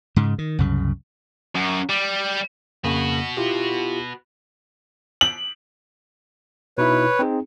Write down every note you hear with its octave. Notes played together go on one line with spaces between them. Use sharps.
G#2 C#3
D#3
C2 F#2 C#3
F#2
G3
F2 C#3 A#3 F#4 B4
E4 F4 G4
F#7
B2 D#4 E4 B4 C#5
C4 D#4 G#4